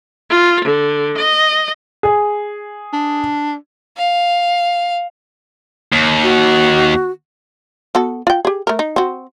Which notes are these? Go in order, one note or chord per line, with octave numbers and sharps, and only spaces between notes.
F4
D3
D#5
G#4
D4
F5
D#2
F#4
B3 F#4 A4
F4 G5
G4 G#4
A3 A#4
D#4
C4 F#4